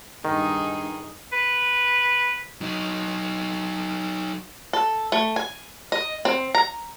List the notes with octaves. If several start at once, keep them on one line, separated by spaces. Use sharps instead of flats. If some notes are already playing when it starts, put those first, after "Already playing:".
G2 D#3 D#4 G#4
B4
F#3 D#4
A4
A3
G#5
D#5
C4
A#5